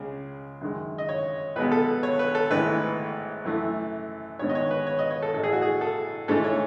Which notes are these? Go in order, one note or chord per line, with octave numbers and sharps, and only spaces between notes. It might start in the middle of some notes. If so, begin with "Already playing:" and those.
Already playing: C#2 C#3 G#3
F#2 D#3 G#3
D#5
C#5
B1 B2 G#3 B3 B4
A4
C#5
B4
A4
G#1 G#2 E3 A3 B4
F#2 E3 A3
G#2 D#3 G#3 B3 C#5
D#5
C#5
B4
C#5
D#5
C#5
A4
A1 A2 E3 A4
G#4
F#4
G#4
A4
G#2 E3 A3 A4
C#5